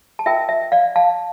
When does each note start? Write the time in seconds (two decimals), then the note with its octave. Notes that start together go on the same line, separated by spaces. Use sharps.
0.19 A5
0.26 F4 A#4 E5 G5
0.49 E5
0.72 D5 F5
0.96 F5 A5